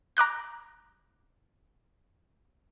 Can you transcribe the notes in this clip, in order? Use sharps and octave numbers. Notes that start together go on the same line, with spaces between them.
A#5 D6 F#6 G6